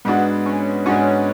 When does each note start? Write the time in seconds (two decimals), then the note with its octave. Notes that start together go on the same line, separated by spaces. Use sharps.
0.05 G#2 G#3 B3 D4 F#4
0.46 C#4
0.86 G#2 G#3 C#4 D4 F#4